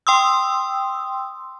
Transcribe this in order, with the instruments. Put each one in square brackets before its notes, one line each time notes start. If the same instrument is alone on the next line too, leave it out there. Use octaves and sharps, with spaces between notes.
[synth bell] G5 C6 D#6 E6